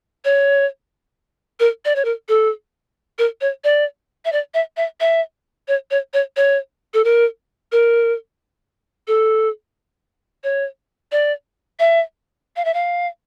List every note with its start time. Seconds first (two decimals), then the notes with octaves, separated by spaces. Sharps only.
0.25 C#5
1.60 A#4
1.85 D5
1.96 C#5
2.05 A#4
2.29 A4
3.19 A#4
3.41 C#5
3.64 D5
4.25 E5
4.32 D5
4.54 E5
4.77 E5
5.00 E5
5.68 C#5
5.91 C#5
6.14 C#5
6.36 C#5
6.94 A4
7.04 A#4
7.72 A#4
9.08 A4
10.44 C#5
11.12 D5
11.79 E5
12.56 F5
12.65 E5
12.74 F5